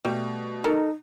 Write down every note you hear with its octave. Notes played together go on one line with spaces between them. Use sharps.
B2 G3 A3
D#4 A4 A#4